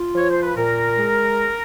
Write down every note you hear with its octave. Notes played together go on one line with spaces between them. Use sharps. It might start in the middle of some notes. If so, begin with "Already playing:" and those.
Already playing: F4
F3 C#5
C5
B4
A#2 A#4
G#3